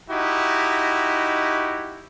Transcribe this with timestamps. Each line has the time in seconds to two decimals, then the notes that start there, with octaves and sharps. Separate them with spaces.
0.11 D#4 E4 F#4 G4